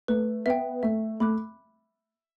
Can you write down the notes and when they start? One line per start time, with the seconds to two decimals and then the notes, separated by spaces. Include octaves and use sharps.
0.08 A3 B4
0.46 B3 E5 G5
0.83 A3 E5
1.20 A3 B5 D6 F#6